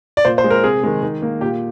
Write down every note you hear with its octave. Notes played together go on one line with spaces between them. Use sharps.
D5
A#2 C5
C5
G#3
A#4
C3 G#4
D#3 G#3
D#3
A#3
A#2 G4